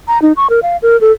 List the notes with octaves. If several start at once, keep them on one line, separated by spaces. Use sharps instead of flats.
A#5
D#4
C#6
A#4
F5
A#4
A4